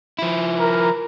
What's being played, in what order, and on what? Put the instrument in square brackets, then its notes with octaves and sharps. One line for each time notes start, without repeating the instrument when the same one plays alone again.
[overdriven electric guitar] F3 E4
[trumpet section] A#4